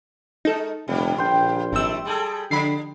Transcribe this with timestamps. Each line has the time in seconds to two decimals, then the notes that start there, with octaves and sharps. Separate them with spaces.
0.45 G#3 D#4 A4 A#4
0.88 F1 A#2 D3 G3
1.18 A#1 G5 C6
1.72 G#1 D#3 G3 A3 E6
2.05 G3 G#4 A4
2.51 D3 F3 D4 B5 C7